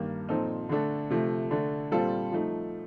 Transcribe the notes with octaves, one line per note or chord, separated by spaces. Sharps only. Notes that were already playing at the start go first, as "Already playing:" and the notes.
Already playing: G2 D#3 A#3
A#2 F3 C4 D#4 A4
D3 A3 D4 A4
C3 F3 A3
D3 A3 D4
A#2 G3 C4 F4 A4
F3 A3 D#4